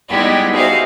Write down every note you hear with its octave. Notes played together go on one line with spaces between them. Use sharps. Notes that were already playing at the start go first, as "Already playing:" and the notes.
G3 G#3 B3 D#4 E4 G4
D#4 F#4 G#4 C5 E5 F5